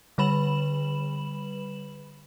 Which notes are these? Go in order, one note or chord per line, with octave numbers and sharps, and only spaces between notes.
D3 G3 B4 B5 E7 F#7